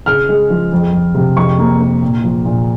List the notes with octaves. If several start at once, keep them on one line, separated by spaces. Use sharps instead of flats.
C#3 F6
G#3
F3
F2
F2
C3
F2 C#6
A#3
A#3
A#2
F3
A#2